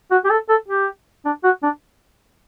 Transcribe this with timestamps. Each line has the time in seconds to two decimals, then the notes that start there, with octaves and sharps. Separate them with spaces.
0.11 F#4
0.25 G4
0.30 A4
0.49 A4
0.68 G4
1.25 D4
1.44 F#4
1.63 D4